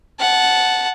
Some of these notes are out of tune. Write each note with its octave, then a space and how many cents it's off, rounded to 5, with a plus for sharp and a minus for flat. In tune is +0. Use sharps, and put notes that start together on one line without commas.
F#5 +0 A5 -15